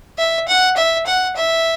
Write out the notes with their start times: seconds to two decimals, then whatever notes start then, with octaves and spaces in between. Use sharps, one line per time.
0.18 E5
0.48 F#5
0.77 E5
1.06 F#5
1.36 E5